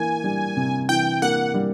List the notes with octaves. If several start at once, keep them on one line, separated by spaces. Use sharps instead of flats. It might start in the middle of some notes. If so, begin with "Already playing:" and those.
Already playing: E3 A#3 G#5
G3
C3
E3 G5
A#3 F#5
G3